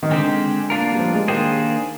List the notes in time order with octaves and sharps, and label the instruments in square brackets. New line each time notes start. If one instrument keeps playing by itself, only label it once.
[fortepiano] D#3
[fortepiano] D3 [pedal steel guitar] G#3 C4 G4 C5
[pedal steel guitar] A#3 D4 F4 A#4
[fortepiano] G3
F3
G#3
[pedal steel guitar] D#3 A#3 D4 G#4 C5 [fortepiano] G4